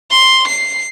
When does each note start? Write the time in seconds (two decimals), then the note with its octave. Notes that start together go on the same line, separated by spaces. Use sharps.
0.11 C6
0.48 C7